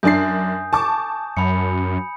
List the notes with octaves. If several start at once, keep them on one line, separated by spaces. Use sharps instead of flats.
F#2 D4 G#5 D#6 G6 C7
A5 C#6 D6
F#2 B5 C#7